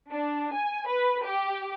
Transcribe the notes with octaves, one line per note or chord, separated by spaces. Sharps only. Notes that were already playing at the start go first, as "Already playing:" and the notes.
D4
G#5
B4
G4